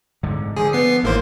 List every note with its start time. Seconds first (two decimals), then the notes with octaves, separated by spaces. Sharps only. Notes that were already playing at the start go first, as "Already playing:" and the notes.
0.23 G#2 D3
0.57 D3 F3 G#4
0.73 B3 C7
1.03 G#1 A2 E3 A#3 C5